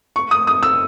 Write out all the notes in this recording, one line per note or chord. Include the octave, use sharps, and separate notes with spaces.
C#6
D#6
D#6
E6